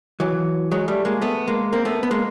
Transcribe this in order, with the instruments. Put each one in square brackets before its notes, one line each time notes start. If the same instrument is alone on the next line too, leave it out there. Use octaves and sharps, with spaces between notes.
[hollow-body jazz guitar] E3 F#3
F#3 G#3
G3 A3
G#3 A#3
A3 B3
G#3 A#3
A#3 C4
A3 B3
B3
G#3 A#3